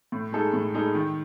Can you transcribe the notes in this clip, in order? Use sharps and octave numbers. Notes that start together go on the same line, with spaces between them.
A2
G#3 D#4 A4
A2
G#3 D#4 A4
D#3